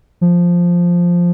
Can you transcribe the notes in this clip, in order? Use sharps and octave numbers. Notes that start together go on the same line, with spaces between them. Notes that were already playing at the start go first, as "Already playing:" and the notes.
F3